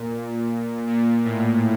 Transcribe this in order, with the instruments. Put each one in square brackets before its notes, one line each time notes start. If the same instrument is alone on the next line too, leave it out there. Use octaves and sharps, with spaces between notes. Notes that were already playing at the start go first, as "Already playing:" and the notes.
Already playing: [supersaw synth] A#2
A#2
A2